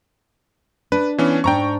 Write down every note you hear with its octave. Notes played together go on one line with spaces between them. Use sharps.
D4 B4
E3 B3 C#4
G#2 D4 G5 A#5 C#6